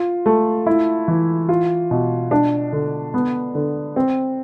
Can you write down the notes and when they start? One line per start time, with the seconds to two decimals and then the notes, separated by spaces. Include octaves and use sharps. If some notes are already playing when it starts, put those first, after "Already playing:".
Already playing: F4
0.26 A3
0.66 E4
1.08 E3
1.49 F4
1.91 B2
2.31 D4
2.73 D3
3.14 B3
3.55 D3
3.96 C4